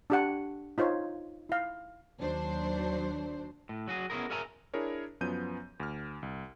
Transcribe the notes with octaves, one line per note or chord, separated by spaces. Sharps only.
D4 G4 F#5
D#4 F4 C5 C#5
E4 F5
D#2 F#3 D4 C5
A2
F#3 F#4 G#4
B3 C#4 E4 G#4 A#4
G#4 A#4 C#5 E5 G#5 A#5
D4 E4 G#4 A#4 C#5
F#2 F3 B3 C#4 G6 D#7
D2 F6
C2